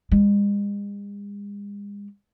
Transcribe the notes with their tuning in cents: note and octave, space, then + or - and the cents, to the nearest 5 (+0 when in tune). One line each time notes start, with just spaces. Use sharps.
G#3 -40